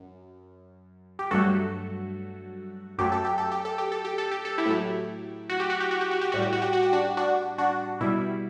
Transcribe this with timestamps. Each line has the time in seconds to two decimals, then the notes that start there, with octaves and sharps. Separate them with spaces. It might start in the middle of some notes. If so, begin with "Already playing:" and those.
Already playing: F#2
1.19 G4
1.31 G2 F#3 A3 F#4 A4
2.98 F#2 F#3 A3 G4
3.12 A4
3.25 G4
3.38 A4
3.52 G4
3.65 A4
3.78 G4
3.92 A4
4.05 G4
4.18 A4
4.31 G4
4.45 A4
4.58 E4 G4
4.66 A2 F#3 A3
5.49 F#4
5.60 G4
5.70 F#4
5.80 G4
5.91 F#4
6.01 G4
6.11 F#4
6.21 G4
6.32 A2 G3 F#4
6.42 G4
6.53 F#4
6.62 G4
6.73 F#4
6.83 G4
6.93 D4 F#4
7.17 D4 F#4
7.58 D4 F#4
8.01 B2 G3 E4